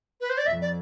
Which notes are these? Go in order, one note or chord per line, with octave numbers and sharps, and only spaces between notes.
B4
C5
D5
F2 E5
D5